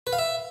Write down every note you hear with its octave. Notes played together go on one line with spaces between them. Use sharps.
B4
F5
E5